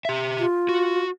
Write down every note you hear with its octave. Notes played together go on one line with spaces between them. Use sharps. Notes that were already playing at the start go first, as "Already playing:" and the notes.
G4 E5
F4
F#4